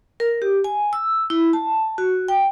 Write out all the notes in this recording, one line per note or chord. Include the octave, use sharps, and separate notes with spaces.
A#4
G4
G#5
E6
E4
A5
F#4
G5